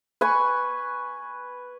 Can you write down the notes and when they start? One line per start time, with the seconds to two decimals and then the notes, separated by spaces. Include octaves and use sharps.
0.21 B4 G#5 C#6